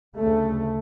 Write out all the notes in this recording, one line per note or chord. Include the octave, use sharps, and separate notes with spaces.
D2 C#3 A3